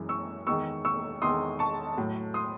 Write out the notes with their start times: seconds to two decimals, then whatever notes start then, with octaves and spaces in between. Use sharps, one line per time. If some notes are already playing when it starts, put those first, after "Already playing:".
Already playing: F#2 E3 G#3
0.09 C#6 E6
0.47 E2 D#3 G#3 C#6 E6
0.85 C#6 E6
1.22 E2 D#3 G#3 C6 D#6
1.59 A5 C#6
1.97 A2 F#3
2.34 C6 D#6